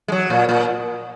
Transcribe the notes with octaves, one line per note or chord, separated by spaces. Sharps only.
G#3
F#3
A#2
A#2